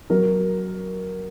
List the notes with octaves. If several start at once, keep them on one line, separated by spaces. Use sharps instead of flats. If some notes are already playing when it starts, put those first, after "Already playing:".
F#3 A#4